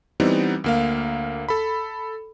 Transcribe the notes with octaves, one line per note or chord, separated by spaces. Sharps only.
E3 G3 B3 C4 D#4
D2 A#3 F5
A4 B5